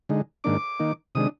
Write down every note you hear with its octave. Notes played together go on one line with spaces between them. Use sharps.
D3 G#3 D#4
G#2 D#3 A#3 D4 D6
D#3 A#3 D#4
C3 D#3 G#3 D4 D#6